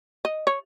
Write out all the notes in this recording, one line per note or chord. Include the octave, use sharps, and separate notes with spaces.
D#5
C#5